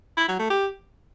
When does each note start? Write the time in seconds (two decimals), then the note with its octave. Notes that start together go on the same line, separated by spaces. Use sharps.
0.17 E4
0.28 F#3
0.39 A3
0.50 G4